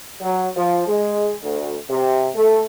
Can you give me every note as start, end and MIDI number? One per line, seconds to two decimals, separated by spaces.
0.21 0.47 54
0.56 0.83 53
0.87 1.34 56
1.42 1.73 38
1.90 2.29 48
2.35 2.60 57